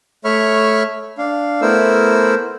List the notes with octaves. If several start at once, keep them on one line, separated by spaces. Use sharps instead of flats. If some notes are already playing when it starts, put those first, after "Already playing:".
A3 C#5 E5 B5 C#6 F6
D4 F5
A3 B3 E4 A#4 C5 E6